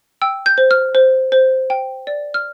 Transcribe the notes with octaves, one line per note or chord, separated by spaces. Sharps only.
G5 E6
G6
C5
F6
C5
C5
G5
D5
F6